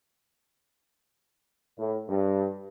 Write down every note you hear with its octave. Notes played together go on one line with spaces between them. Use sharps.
A2
G2